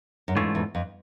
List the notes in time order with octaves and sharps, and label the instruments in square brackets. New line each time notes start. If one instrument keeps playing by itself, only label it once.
[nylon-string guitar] F#2
[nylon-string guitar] F2 [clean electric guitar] G#2 E3 A3 C#4 F4
[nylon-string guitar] E2
F2